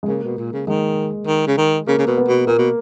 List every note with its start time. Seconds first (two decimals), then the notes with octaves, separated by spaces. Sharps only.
0.03 G#3
0.08 C#3 A#3
0.23 B2
0.38 A#2
0.53 C#3
0.67 D#3 G#3
1.27 D#3
1.47 C#3
1.58 D#3
1.87 C#3 A#3
1.99 C#3
2.07 B2
2.18 B3
2.28 B2
2.47 A#2 A#3
2.59 B2